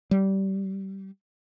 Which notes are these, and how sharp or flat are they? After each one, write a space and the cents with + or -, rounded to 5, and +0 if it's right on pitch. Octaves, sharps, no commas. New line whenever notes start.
G3 -20